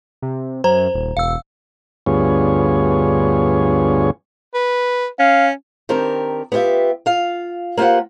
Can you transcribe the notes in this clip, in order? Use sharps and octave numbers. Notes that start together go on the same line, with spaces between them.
C3
F#2 C5 A#5
D#1
E1 F5 E6
D2 G2 B3 F4 G#4 C#5
B4
C#4 F5
D#3 C4 D4 G4 A#4
B3 E4 F4 G4 E5
F4 F5
A#3 F4 G4 C5 F#5